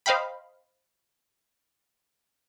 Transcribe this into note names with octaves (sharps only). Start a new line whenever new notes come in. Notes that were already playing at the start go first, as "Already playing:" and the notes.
C5 D#5 F5 G5 B5